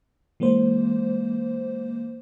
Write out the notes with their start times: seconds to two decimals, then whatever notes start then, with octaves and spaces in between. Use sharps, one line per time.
0.40 E3 G#3 A#3 C5